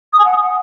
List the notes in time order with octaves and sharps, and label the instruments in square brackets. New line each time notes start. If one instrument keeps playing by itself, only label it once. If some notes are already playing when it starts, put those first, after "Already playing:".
[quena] D#6
G#5
F#5